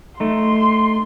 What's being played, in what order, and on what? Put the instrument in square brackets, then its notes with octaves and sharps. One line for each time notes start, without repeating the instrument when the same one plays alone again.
[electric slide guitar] A3 D#4 [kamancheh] C6